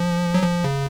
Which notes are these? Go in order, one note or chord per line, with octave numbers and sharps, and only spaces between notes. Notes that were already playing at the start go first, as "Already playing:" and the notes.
Already playing: F3
F#3
F3
C#3